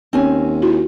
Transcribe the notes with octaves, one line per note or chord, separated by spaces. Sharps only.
D#2 C4 C#4 G#5
E4 F#4